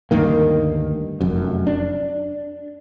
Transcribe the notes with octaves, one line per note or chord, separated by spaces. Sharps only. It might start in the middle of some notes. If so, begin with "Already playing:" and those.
D2 G2 D#3 A#3
F1 F#2
D4